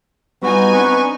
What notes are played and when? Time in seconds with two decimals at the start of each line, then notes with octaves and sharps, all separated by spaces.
0.43 G3 B3 D#4 F4 F#4 G#5
0.74 C4 D4 B4 C#6